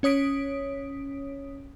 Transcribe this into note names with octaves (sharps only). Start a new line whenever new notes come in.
C#4 C#5 D#6 B6 D7